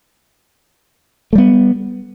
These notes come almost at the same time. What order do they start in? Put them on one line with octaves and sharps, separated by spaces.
A3 G3 B3